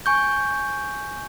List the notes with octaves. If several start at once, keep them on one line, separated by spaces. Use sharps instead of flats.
G#5 C#6 G6